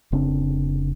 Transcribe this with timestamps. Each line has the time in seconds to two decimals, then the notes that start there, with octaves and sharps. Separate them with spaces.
0.12 F1 C#3 C4 D4